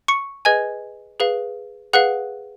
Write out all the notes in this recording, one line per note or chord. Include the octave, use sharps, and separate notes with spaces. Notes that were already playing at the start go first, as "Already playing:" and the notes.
C#6 C#7
G#4 B4 D#5 G#5 G#6
G#4 B4 F5
G#4 B4 F5 F#5 F#6